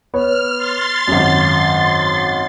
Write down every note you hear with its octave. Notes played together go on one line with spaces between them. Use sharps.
B3 C#5 F6
C6 A6
G#1 F#2